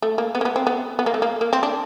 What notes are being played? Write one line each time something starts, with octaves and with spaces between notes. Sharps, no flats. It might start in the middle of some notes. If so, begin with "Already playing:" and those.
A3
A#3
B3
A#3
B3
C4
B3
B3
A#3
A3
A#3
A#3
C4
D4